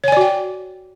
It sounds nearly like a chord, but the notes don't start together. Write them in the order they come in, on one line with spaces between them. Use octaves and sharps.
C#5 G#5 D5 F#4 G5